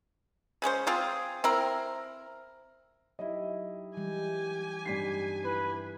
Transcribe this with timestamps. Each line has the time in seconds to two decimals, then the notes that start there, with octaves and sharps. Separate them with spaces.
0.62 C#3 G#3 C#4 C5
0.87 C4 F4 G#4
1.44 C4 E4 A#4
3.19 F#3 D#4 E4 G4 D#5
3.97 E3 G3 G#3 G4 G#5
4.86 G2 G3 C4 D#4 B6 C7
5.45 E4 B4